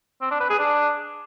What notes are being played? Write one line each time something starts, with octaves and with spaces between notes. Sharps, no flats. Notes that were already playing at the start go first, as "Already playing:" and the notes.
C4
D4
B4
G#4
D4